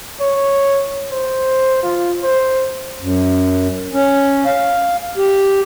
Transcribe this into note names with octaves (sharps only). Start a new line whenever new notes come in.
C#5
C5
F4
C5
F#2
C#4
F5
G4